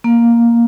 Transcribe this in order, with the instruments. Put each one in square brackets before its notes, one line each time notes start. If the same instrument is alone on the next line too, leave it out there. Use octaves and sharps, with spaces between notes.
[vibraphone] A#3